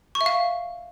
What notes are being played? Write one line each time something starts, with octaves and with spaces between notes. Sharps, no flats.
C#6
E5
F5